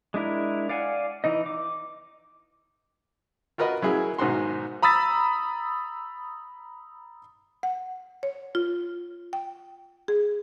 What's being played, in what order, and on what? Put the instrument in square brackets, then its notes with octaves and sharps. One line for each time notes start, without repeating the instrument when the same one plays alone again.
[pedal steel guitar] G#3 D4 E4 A#4
D5 F5 F#5 G#5
E3 D#4 D#5
D6
[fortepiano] F4 F#4 A#4 B4 D#5
C#3 F#3 E4 G#4 A#4
B1 G#2 D#3 F#4 C6
[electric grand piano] A#5 B5 D#6 E6 A6 B6
[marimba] F#5
C#5
F4
G5
G#4